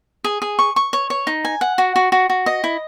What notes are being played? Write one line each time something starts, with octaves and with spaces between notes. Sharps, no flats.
G#4
G#4
C#6
C#6
C#5
C#5
D#4
G#5
F#5
F#4
F#4
F#4
F#4
D#5
E4